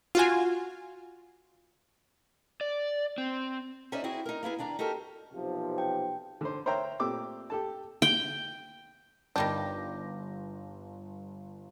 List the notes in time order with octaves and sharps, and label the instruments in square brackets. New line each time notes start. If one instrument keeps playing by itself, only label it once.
[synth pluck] F4 F#4 G#5
[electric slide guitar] D5
C4
[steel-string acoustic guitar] C#4 D#4 C5 D5 E5
C4 E4 F#4 G#4
D#4 A#4
A#3 B3 E4 G#4
D#2 D4 D5 A#5
D#4 F#4 G4 A4 A#4
[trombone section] B1 C3 F3
[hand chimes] G5
[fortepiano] D3 C5
A#4 C5 C#5 E5 G5 A#5
A#2 A3 C4 G4 D6 E6
G4 A4 A5
[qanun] G5
[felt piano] G1 A#6 [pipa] D#3 G3 G4 [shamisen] D4